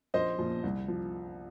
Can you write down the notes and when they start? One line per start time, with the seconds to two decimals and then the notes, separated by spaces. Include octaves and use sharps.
0.14 A#1 C5 D#5
0.38 A#2 F3
0.63 C2
0.88 F3